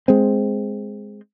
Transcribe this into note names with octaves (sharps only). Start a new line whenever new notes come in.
G#3 C4